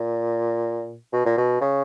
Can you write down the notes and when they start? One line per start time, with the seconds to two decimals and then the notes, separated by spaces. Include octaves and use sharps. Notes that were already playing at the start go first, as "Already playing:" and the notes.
Already playing: A#2
1.13 B2
1.25 A#2
1.37 B2
1.61 C#3